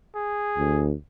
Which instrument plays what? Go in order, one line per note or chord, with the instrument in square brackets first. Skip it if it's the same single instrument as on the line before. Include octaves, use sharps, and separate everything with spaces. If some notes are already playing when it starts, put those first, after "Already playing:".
[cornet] G#4
[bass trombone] D2